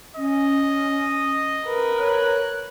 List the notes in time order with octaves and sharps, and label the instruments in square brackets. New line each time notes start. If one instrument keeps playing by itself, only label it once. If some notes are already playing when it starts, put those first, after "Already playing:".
[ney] C#4 [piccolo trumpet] D#5
[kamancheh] A#4 B4
[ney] C#5 [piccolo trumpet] F#6